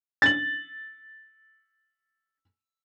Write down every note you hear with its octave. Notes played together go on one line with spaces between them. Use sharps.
A6 F#7